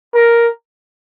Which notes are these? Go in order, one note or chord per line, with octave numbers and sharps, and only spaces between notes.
A#4